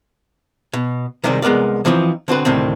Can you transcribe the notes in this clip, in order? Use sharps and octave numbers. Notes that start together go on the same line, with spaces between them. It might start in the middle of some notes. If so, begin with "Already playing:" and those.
B2
C3 D#3 G3 G#3 B3 C4
C2 G#3 B3 A#4 D5
E3 F3 B3 C4 D#4
D3 C4 F#4 B4
D2 A2 C3 D#3 C4